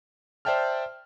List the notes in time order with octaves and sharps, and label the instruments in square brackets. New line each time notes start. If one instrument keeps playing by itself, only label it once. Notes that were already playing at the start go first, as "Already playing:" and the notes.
[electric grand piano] C5 D5 E5 G5 A5 F6